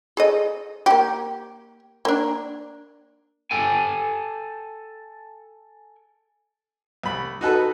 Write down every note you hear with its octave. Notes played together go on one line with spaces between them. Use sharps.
G#4 A4 D#5
A#3 G4
A#3 D4
A4 G5 G#5
C2 B5
D#4 F#4 A4 B4